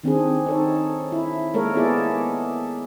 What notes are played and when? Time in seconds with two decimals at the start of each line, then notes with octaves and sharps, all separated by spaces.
0.04 D#3 C4 D4 G#4
0.46 D#4 A4 C#5
1.12 E4
1.54 G#3 A#3 A4 A#4 C#5
1.76 B3 E4 G#4 A4 D5